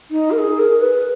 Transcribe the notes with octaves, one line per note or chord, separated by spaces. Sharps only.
D#4
A#4
G#4
A#4
B4